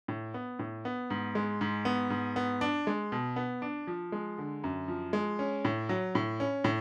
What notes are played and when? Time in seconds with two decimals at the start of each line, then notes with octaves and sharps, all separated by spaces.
0.08 A2
0.34 B3
0.59 A2
0.85 B3
1.10 G#2
1.35 G#3
1.61 G#2
1.85 B3
2.10 G#2
2.36 B3
2.61 D4
2.87 G#3
3.12 B2
3.36 B3
3.62 D4
3.87 F3
4.12 G#3
4.38 D3
4.64 F#2
4.88 F3
5.13 G#3
5.39 C#4
5.65 A2
5.89 F#3
6.15 A2
6.40 C#4
6.64 A2